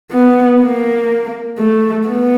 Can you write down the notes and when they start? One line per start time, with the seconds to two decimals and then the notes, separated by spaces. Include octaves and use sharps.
0.12 B3
0.61 A#3
1.59 A3
2.08 B3